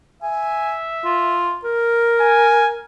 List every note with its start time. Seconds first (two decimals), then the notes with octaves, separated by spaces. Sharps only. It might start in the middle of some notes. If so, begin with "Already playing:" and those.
0.23 E5 G#5
1.05 F4
1.64 A#4
2.20 G#5